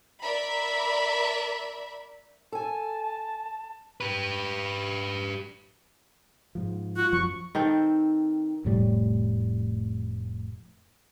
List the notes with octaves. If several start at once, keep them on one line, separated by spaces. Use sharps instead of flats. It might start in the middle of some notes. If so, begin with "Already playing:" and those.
A#4 D5 E5 B5
A4 G#5 A5
G4 B4
G#2 F3
F4 F#4
F#2 F3 F#3 C#6
D#3 C4 A4
F1 A2 G3